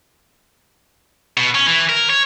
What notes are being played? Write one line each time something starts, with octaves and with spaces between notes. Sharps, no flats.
B2
C#4
E3
A#4
C#5